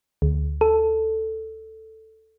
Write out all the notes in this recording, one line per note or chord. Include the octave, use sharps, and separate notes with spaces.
D2
A4